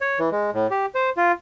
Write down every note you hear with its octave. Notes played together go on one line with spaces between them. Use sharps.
C#5
E3
G#3
A2
G4
C5
F4